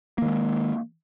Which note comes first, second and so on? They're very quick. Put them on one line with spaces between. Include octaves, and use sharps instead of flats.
A#3 D#3 G#3